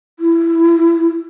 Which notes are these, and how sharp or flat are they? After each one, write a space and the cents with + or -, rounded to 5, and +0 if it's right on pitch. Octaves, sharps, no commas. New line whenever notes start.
E4 +20